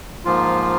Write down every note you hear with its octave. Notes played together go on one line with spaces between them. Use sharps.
G#2 F3 A#3 F4